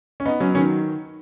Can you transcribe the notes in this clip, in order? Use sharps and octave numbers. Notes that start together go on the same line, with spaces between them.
C#4
B3 D#4
F#3 C#4
D#3 C#4